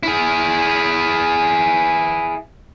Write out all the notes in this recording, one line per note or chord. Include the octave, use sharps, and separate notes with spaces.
E4 G#4